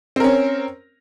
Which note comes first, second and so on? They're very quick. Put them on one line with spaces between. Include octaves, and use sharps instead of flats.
C4 A#4 C#4